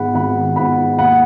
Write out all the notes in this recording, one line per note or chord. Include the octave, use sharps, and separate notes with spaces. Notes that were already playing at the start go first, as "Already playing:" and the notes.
Already playing: G#1 G#2 G#3 B3 F#5 B5
G#1 F#5 B5
G#2 G#3 B3 F#5 B5
D#2 F#5 B5